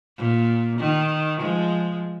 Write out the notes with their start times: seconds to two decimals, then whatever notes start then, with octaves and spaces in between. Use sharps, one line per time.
0.17 A#2
0.79 D#3
1.40 F3 G#3